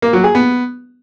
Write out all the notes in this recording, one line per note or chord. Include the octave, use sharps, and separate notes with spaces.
A#3
F#3
G#4
B3